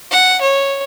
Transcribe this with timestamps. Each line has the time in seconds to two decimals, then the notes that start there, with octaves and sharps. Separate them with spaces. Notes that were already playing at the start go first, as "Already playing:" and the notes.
0.11 F#5
0.41 C#5